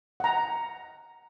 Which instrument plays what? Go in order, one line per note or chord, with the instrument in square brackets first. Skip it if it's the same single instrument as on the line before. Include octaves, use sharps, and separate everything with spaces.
[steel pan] F#5 A#5